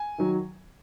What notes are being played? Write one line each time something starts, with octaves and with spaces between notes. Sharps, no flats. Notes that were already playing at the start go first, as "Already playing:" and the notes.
Already playing: G#5
D#3 F#3